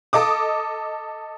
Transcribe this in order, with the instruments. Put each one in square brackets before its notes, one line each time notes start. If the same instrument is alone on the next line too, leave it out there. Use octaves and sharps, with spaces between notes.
[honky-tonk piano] A4 D#5 D6 D#6